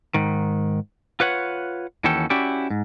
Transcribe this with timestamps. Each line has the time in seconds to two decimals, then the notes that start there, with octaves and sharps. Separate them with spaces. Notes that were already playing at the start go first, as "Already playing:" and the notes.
0.14 G#2 D#3
1.20 F4 B4 C#5 F#5
2.04 D#2 E3 C#4 F#4 A4 G5
2.30 C#4 E4 F#4 G4 D5
2.70 G#2